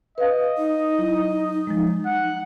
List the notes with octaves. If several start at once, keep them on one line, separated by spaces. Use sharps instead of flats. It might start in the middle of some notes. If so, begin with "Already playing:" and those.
B4 D#5 F5
D#4
F#3 E4
F3 G#3
F#5